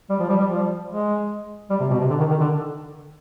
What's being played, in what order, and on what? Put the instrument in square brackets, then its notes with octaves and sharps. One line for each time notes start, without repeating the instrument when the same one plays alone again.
[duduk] G3
F3
G3
G3
F3
G#3
G3
C3
B2
C3
D3
D#3
D#3
D3